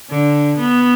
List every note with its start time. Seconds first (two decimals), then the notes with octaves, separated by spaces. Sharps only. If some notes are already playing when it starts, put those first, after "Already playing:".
0.10 D3
0.59 B3